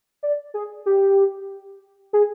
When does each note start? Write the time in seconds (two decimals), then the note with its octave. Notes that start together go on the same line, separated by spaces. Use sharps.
0.23 D5
0.54 G#4
0.86 G4
2.13 G#4